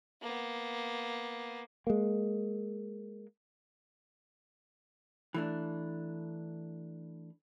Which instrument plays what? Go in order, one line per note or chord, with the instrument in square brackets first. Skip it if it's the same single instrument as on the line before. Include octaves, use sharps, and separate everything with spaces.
[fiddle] A#3 B3
[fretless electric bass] G#3 A#3
[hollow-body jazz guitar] E3 A3 D4